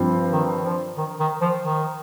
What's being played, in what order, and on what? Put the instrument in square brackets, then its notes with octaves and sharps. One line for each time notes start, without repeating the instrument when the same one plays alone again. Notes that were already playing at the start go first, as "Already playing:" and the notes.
Already playing: [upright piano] G2 F3 C4
[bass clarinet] D#3
F3
D#3
D#3
F3
D#3